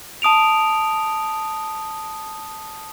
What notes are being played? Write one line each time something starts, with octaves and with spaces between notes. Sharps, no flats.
A5 D#6 D7 F7